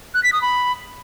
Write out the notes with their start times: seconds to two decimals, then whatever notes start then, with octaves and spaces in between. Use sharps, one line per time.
0.14 F#6
0.23 B6
0.33 D#6
0.42 B5